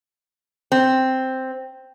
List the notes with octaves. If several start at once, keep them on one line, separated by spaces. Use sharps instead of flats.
C4